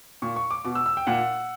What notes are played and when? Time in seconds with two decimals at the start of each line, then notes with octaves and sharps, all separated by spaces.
0.22 A#2 C#6
0.36 C#6
0.51 D6
0.65 B2 D6
0.75 E6
0.86 E6
0.97 G5
1.07 A#2 F#5